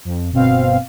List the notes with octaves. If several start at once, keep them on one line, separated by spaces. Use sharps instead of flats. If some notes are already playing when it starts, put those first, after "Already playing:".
F2
G1 B2 C4 F5